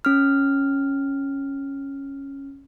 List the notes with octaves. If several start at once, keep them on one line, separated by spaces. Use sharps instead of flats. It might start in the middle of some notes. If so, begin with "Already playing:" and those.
C#4 F6